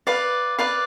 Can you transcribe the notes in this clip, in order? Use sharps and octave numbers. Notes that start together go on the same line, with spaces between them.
B4 D5 F5
B4 D5 F5